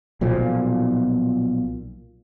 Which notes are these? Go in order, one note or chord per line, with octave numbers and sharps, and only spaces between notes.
B1 A#2 F3